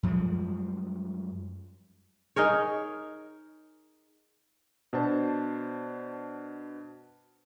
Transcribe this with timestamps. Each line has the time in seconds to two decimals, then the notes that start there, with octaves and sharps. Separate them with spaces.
0.03 F#2 F3 G3 G#3
2.36 D#4 G#4 A#4 C#5
4.93 B2 D4 C5 A5